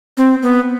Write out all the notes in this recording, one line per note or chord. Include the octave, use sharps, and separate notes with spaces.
C4
B3